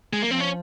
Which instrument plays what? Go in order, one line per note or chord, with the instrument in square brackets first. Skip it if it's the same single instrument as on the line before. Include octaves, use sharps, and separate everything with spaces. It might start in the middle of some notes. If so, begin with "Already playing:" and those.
[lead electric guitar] G#3
[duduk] F3 [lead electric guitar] A#3
[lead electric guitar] C4
C#4